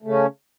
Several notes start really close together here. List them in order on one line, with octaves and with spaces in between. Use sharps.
A3 C#3 C#4